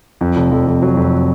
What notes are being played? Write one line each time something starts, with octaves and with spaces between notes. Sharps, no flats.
F2
F1
F2
F2
F#3
F2